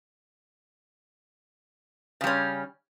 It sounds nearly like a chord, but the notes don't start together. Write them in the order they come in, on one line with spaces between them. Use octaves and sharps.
C#3 G3 C#4